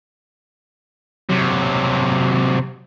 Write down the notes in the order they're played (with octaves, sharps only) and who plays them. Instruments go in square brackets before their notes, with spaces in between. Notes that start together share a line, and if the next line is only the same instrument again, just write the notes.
[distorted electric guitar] C3 F#3